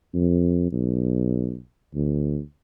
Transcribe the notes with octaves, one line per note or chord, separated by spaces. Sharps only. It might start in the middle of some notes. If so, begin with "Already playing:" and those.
F2
B1
D2